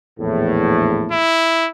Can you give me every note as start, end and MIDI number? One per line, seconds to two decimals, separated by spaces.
0.19 1.18 34
0.19 1.18 40
0.19 1.18 45
1.11 1.68 64